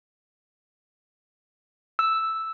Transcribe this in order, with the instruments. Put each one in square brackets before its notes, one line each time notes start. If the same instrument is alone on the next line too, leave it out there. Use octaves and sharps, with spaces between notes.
[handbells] E6